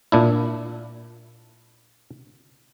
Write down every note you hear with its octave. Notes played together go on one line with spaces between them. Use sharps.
A#2 D4 E4